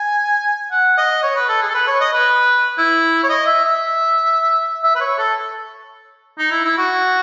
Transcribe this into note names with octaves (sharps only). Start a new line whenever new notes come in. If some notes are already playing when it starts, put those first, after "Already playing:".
Already playing: G#5
F#5
D#5
C#5
B4
A4
G#4
A4
B4
C#5
D#5
B4
E4
C#5
D#5
E5
E5
E5
B4
C#5
A4
D#4
E4
E4
F#4